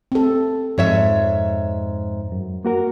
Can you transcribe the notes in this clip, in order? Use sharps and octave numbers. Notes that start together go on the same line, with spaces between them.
C4 A4
F2 G#2 C#5 E5
F#2
A#3 F#4 A#4